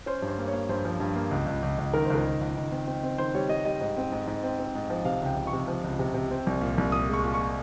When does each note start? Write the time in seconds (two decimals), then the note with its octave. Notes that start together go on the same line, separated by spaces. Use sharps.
0.06 C#4 C5
0.22 G2
0.28 C5
0.38 A#3
0.48 C#5
0.53 A#3
0.69 G2 C5
0.85 F3
1.00 G2
1.16 A#3
1.31 C#2
1.46 C#2
1.63 C#2
1.78 C#2
1.93 D#3 A#4
2.05 C#2 C5
2.15 A#4
2.24 C#2
2.41 C#2
2.56 D#3
2.72 C4
2.87 C4
3.03 C4
3.18 D#3 C5
3.35 G3 C#5
3.49 G3 D#5
3.65 G3 D#5
3.81 G#2
3.97 C4
4.12 G#2
4.27 G#2
4.44 C4
4.59 C4
4.75 G#2
4.90 F3
5.05 C3 F5
5.21 C#2 G5
5.36 C#2
5.47 C#6
5.53 C3
5.68 F3
5.84 C#2
5.99 C3
6.14 C3
6.31 C4
6.47 C2
6.61 A#2
6.78 C2
6.92 A#2 D#6
7.09 G#3 C#6
7.24 A#2
7.34 C#6